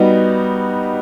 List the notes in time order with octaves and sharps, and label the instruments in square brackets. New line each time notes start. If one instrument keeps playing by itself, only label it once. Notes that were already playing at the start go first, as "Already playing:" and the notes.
Already playing: [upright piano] G3 B3 D#4 F#4